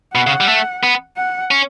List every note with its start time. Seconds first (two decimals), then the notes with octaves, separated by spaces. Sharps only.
0.15 B2 F#5
0.27 C#3
0.40 G3
0.48 A3
0.83 B3
1.17 F#5
1.51 C#4